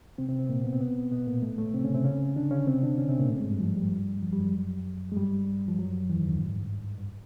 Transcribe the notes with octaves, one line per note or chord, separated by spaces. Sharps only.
C3 C4
C3 C4
C3 C4
A#2 A#3
B2 B3
C4
B2 B3
B2 B3
A#2 A#3
A2 A3
A2 A3
C3 C4
C#3 C#4
C3 C4
C#3 C#4
D3 D4
C#3 C#4
C3 C4
D3 D4
C#3 C#4
C3 C4
A#2 A#3
A2 A3
G#2 G#3
G2 G3
F2 F3
G2 G3
F2 F3
G3
F#2 F#3
G#3
G2 G3
F3
F#2 F#3
E2 E3
D#2 D#3
D2 D3
G#2
G2
G2